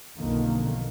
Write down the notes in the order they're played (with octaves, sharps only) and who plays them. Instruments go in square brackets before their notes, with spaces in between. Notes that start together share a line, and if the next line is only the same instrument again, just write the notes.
[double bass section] B1 F2 B2 D3 D#3 A#3